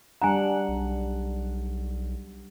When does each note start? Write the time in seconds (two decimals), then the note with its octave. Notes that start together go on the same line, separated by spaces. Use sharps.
0.22 G3 D4 F#5 G#5 A#5
0.68 B1